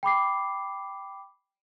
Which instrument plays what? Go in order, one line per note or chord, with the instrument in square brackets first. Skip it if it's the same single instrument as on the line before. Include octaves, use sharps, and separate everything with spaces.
[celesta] G5 B5 D6 C7